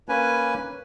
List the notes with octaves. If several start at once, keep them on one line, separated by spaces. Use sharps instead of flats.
A#3 C#4 B4 G#5